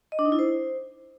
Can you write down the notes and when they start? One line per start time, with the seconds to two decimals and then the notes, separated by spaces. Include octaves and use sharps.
0.12 D#5
0.19 D4
0.25 D#4
0.32 E4
0.39 C5